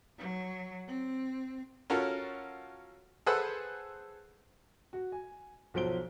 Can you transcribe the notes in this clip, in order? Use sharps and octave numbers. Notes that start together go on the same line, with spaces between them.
F#3
C4
C#4 F4 F#4 A4 A#4
G#4 A4 B4 C5 F#5 E6
F#4
G#5
B1 F3 F#3 C5 D7 G7